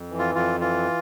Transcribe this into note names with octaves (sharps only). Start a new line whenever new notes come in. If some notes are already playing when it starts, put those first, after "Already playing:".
Already playing: F2
E3
F4
F2 F4
E3 F4